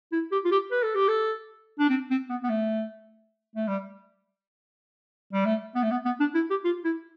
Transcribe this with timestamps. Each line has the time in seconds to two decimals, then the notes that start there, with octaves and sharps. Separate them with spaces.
0.12 E4
0.32 G4
0.45 F4
0.51 G4
0.71 B4
0.83 A4
0.95 G4
1.08 A4
1.79 D4
1.89 C4
2.10 C4
2.30 B3
2.44 B3
2.49 A3
3.56 A3
3.68 G3
5.33 G3
5.45 A3
5.75 B3
5.83 A3
5.91 B3
6.05 B3
6.20 D4
6.35 E4
6.50 G4
6.64 F4
6.84 E4